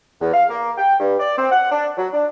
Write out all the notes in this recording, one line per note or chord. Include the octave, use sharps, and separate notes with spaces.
E2
F5
A#3
G5
G2
D5
C4
F#5
D4
F#3
D4